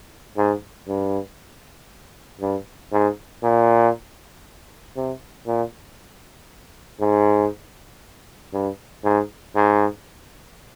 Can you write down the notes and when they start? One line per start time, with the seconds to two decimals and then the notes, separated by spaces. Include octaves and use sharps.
0.37 G#2
0.88 G2
2.41 G2
2.93 G#2
3.43 A#2
4.96 C3
5.47 A#2
7.00 G#2
8.53 G2
9.04 G#2
9.56 G#2